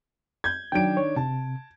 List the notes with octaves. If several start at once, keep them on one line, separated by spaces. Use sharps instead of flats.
G6 G#6
D#3 F#3 D4 G5 D7
C#5
C3 A5